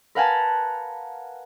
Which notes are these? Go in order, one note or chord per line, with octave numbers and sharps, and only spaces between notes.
A#4 B4 F5 F#5 G#5 A5